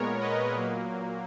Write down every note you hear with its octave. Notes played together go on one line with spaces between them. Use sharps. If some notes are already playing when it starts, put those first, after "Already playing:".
Already playing: A#2 G#3 B3 A#4 C#5
B4 D#5
A#2 F#3 A#3